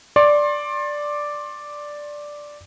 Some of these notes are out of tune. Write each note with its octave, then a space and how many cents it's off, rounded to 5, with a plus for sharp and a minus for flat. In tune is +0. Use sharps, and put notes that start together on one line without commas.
D5 +0 C6 +35